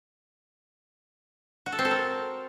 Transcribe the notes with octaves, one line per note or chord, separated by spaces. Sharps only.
F#4
A4
C4
A4
A#4